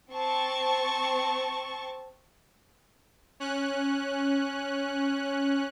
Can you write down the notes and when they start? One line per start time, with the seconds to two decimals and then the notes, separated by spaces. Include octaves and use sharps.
0.11 C4 A5 C#6
3.40 C#4 F#6